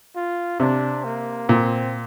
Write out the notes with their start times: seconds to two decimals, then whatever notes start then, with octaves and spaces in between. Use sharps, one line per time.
0.16 F4
0.60 C3 D4
1.04 A#3
1.49 A#2 C4